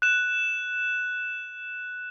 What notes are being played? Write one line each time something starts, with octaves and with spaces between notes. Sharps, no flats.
F#6 E7